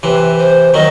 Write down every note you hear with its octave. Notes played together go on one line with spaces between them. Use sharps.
C3 E3 B4
C5
D#3 F#3 D#5